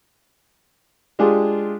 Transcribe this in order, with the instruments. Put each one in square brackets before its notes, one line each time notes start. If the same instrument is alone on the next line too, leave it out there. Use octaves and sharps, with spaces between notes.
[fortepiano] G#3 D4 F4 G4 G#4